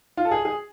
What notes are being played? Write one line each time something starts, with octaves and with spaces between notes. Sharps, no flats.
F4
A4
G#4
G#4